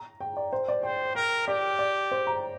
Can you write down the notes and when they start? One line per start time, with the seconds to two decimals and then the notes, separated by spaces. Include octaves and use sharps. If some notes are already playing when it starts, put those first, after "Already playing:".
Already playing: A#5
0.21 G5
0.37 D5
0.53 C5
0.68 D5
0.83 C5 G5
1.15 A#4 G5
1.47 G4 D5
1.79 D5
2.11 C5
2.27 A#5